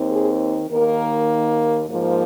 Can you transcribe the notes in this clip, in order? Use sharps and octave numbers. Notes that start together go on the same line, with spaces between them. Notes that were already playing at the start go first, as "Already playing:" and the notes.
Already playing: D#2 D#3 C4
G#4
D#2 D#3 A#3 A#4
G#2 F3 A#3